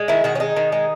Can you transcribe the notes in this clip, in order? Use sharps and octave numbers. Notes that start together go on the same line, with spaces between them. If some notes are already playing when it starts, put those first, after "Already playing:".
Already playing: G#3
D#3 E4
D#3 F#4
C#4
G#3 D#4
D#3
G#3